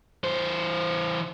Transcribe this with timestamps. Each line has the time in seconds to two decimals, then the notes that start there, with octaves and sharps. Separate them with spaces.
0.24 E3 C5